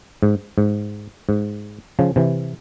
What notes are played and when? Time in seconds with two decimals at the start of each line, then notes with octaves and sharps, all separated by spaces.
0.23 G#2
0.58 G#2
1.29 G#2
1.99 C#3 F3
2.16 C3 E3